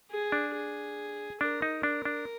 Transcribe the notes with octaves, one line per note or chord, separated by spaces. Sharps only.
G#4
D4
G#4
D4 A#4
D#4
D4 A#4
D4